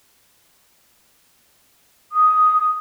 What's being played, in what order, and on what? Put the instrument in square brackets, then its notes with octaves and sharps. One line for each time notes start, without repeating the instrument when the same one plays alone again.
[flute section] D#6